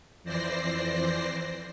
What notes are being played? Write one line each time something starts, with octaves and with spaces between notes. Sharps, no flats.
F2 E3 C5 D5 A#6 C7